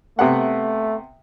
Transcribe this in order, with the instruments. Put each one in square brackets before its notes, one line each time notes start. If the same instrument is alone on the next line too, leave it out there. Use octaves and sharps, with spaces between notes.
[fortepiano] C3 B3 F#5 [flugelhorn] A3